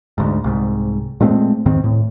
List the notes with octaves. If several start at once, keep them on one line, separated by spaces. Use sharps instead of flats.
D2 G#2
C2 G#2
A#2 G#3 A3 C4
D#2 G#2 D#3 C4
A2